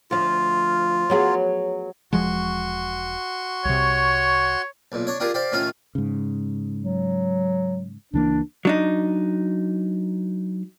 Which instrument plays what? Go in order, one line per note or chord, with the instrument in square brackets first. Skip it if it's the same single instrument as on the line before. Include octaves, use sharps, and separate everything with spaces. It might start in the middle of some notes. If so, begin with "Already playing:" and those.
[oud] D2 F3 [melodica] F4
[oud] F#3 B3 G#4
[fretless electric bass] E1 F3 G#3 [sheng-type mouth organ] F#4 C6 C#6
[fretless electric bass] C2 C3 [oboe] C#5
[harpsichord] B1 A#2
D4 C#5
D4 F4 G4 G#4 A#4
G4 C5 D5 F5
A2 D#3 C#4 F4 F5
[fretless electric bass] G#2 C#3
[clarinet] F#3
[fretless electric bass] C#2 E3 A#3 [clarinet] D4
[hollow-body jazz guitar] F#3 D4 D#4